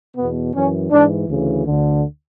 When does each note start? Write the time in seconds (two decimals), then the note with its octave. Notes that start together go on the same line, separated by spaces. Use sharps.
0.17 E2 B2 B3
0.53 F#2 E3 C#4
0.92 G#2 E3 D4
1.28 D2 C#3 E3
1.65 D2 D3